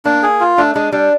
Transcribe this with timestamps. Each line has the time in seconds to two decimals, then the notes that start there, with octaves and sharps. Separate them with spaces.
0.05 A#3 D4
0.23 G#4
0.41 F4
0.58 A3 D4
0.75 G#3 D4
0.92 G3 D4